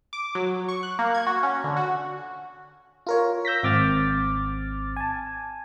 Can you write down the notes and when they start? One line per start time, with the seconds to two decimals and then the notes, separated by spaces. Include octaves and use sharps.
0.13 D6
0.35 F#3
0.69 C#6
0.83 F#6
0.99 A#3
1.14 G#6
1.27 F#4
1.43 C#4
1.64 D3
1.77 F#4
3.07 F4 A#4 C#5
3.45 E6 G6 A#6 B6
3.63 G#1 C4 D6 F6 A6
4.96 G#5 A5